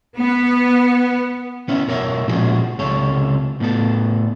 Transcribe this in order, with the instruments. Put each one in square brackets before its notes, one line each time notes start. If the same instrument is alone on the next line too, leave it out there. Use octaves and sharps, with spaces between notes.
[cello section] B3
[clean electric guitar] B3 C#4 E4
B2 A#4 C#5 E5
A#2 F3 G#3 B3 C#4 F#4
C#2 C3 A4 C#5
A2 B3 A4 A5